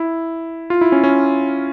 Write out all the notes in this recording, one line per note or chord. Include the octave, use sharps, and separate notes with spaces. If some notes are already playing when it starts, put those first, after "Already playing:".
Already playing: E4
F4
E4
C#4
C#4